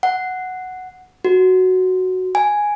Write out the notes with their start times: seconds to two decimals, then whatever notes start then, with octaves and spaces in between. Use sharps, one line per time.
0.03 F#5
1.25 F#4
2.35 G#5